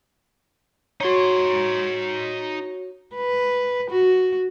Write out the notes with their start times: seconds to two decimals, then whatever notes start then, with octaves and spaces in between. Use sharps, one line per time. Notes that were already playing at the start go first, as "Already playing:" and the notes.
1.01 D#4 F#4 C#5 C6
3.15 B4
3.91 F#4